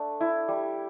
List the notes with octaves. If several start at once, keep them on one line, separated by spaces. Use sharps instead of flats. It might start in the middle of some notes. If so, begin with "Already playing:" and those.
Already playing: A3 D4
E4
G3